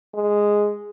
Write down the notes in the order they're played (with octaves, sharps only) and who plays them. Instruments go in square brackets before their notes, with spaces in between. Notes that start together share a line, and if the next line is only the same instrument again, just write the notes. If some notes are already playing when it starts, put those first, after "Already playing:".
[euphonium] G#3